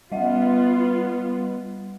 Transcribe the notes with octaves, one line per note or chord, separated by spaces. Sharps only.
G3 B3 F4 D#5 F#5